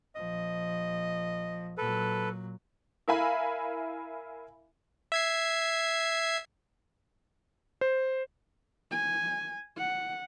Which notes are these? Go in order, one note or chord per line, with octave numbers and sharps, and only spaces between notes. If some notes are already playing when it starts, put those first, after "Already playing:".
A#1 F3 D#5
A#2 F#3 A4 B4
E4 A#4 E5 F5 G#5 B5
E5 G#6 C7
C5
G#5
F#5